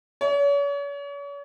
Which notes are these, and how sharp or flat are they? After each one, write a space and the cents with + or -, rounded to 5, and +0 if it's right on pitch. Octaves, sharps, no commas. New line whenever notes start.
C#5 +40